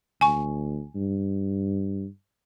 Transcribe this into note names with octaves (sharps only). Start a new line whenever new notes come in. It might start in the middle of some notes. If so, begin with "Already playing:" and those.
D2 G#5 C#6
G2